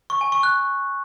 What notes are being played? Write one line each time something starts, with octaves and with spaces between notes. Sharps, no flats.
C#6
G#5
C#6
F#6